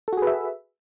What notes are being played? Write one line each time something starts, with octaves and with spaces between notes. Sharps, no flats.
F#4 G#4 A4 B4 E5